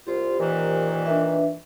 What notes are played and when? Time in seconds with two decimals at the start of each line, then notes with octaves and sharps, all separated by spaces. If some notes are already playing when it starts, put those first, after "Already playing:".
0.07 C2 F4 G4 C5
0.39 A#2 D#3 E3
1.06 D4 B4 E5